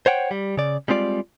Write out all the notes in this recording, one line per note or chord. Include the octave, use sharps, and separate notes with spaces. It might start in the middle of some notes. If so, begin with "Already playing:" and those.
C5 C#5 F#5 G5
G3
C#3 D5
G3 G#3 C4 F4 D5